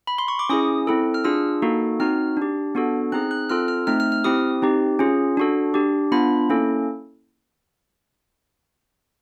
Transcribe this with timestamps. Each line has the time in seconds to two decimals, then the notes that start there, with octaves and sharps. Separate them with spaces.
0.07 B5
0.18 C6
0.28 C#6
0.39 D6
0.49 C#4 E4 G#4 D#6
0.87 C4 E4 A4
1.14 F6
1.24 D4 F4 G#4 E6
1.62 A#3 D#4 F#4 A4
2.00 C4 D#4 F#4 F6
2.37 D4 G4
2.75 B3 D4 F#4 A4
3.12 C4 D#4 G#4 F#6
3.31 F#6
3.50 C4 F4 A4 F6
3.68 F6
3.87 A3 C4 D#4 F6
4.00 F6
4.12 F6
4.24 C4 E4 G4 D#6
4.62 C4 D#4 G4
4.99 C#4 F4 G#4
5.37 D4 F#4 A4
5.74 D4 G4
6.12 B3 D4 F4 B5
6.49 A#3 C#4 E4 A4